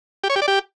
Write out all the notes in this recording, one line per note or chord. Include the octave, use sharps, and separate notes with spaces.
G4
C#5
G4
D5
G4